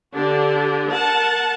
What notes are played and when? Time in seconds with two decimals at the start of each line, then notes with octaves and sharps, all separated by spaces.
0.15 D3 D4 G4
0.93 A#4 F#5 A5